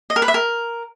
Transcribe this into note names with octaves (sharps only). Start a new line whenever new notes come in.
D#5
A#4
B4
E5
A#4